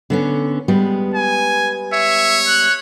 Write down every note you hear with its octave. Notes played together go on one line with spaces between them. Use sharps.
D3 B3 C#4
G3 G#3 B3
G#5
C#5 E5
F#6